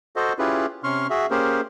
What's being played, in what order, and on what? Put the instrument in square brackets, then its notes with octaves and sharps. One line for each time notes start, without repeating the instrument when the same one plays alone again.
[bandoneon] F#4 A4 C5 D#5
C#4 E4 F4 G4 G#4 B4
C3 C#4 C6 C#6 F6
F#4 G#4 E5
A#3 C#4 G4 G#4 A#4 C5